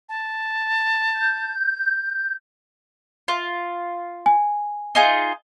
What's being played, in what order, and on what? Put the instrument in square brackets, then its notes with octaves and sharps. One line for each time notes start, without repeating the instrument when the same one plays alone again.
[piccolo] A5
[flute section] G6
[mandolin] F4
[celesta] G#5
[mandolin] D#4 F4 G#4